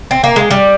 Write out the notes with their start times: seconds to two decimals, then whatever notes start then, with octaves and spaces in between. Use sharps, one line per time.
0.11 C4
0.24 A#3
0.36 G#3
0.51 G3